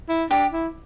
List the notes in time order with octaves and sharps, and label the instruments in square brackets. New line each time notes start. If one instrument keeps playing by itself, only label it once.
[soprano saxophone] E4
[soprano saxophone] D4 [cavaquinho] G4
[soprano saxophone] E4